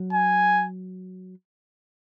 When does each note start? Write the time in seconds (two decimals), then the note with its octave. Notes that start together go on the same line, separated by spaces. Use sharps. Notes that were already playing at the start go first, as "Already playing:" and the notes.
Already playing: F#3
0.13 G#5